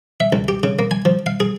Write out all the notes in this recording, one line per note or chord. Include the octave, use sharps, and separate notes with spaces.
E5
C#2
G4
C#3
A#3
G#5
F3
F5
G#4